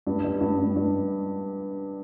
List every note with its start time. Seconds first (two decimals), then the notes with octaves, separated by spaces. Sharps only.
0.07 G2
0.24 G3
0.41 G2
0.58 G2
0.76 G2